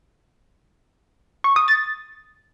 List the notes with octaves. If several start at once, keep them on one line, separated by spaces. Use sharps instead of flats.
C#6
D#6
A6